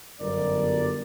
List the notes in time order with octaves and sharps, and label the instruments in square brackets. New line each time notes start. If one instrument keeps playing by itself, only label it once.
[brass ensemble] G1 F#2 A#4 D5